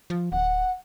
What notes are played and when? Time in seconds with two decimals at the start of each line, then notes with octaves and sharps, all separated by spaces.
0.10 F3
0.32 D1 F#5